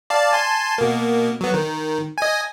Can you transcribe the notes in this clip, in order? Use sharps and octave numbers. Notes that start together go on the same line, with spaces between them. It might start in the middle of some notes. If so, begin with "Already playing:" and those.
D5 F5 A5
G#5 A5 C6
B2 A#3
F#3 B3
D#3
D#5 G#5